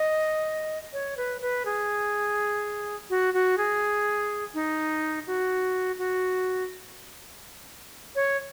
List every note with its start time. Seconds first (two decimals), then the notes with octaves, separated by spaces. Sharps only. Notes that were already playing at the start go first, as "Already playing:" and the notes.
Already playing: D#5
0.93 C#5
1.17 B4
1.41 B4
1.66 G#4
3.10 F#4
3.34 F#4
3.58 G#4
4.54 D#4
5.27 F#4
5.99 F#4
8.16 C#5